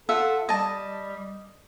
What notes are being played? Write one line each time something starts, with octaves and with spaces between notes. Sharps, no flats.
F4 A4 E5 F#5
G3 D#5 A5